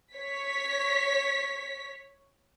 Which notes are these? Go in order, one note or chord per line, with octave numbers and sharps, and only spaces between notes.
C#5 B6